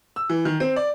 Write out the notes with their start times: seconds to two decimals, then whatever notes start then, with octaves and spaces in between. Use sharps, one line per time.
0.16 E6
0.29 E3
0.45 D#3
0.60 C4
0.76 D5